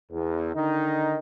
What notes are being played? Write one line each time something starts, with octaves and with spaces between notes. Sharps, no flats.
E2
D3 D#3 D#4